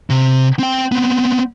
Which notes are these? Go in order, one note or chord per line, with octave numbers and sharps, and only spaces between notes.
C3
C4 G5
B3 C4